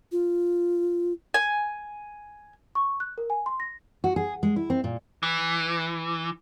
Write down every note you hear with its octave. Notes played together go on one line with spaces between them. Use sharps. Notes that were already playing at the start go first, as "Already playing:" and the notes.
F4
G#5
C#6
F#6
A#4
G#5
C6
A#6
F#4
G#4
G#3
E4
C4
A#2
E3